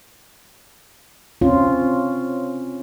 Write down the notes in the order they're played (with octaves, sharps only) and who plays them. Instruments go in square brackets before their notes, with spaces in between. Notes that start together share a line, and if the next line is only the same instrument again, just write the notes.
[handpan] C4 C#4 F4